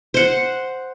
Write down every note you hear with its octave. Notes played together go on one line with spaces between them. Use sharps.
C5 F#5